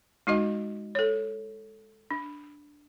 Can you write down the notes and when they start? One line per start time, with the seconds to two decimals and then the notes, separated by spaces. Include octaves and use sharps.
0.27 G#3 D#4 F#4 D#5
0.95 A4 C#5
2.11 D4